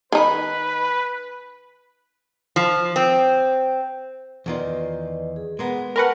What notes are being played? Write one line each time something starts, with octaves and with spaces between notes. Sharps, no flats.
D#3 D#4 B4 G#5 B5
F3
C4
E2 D#3 F4 B4 D5 D#5
G#4
G#3 A#3 B3
A#4 B4 F#5 G5 A5 C#6